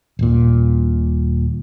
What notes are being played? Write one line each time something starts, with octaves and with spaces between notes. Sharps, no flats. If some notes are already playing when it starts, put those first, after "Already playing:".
D#1 A#2